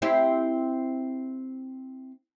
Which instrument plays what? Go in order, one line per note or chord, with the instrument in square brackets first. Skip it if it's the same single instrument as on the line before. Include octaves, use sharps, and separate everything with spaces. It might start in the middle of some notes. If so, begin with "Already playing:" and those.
[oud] C4 E4 G4